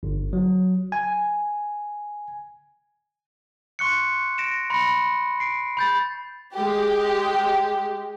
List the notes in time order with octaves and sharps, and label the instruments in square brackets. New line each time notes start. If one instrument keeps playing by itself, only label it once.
[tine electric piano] G1
F#3
G#5
[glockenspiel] C6 C#6 F#6 C#7
A#6 D7 E7
B5 C6 A#6 C#7
C7 D7
B5 G6 A6
[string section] G#3 G4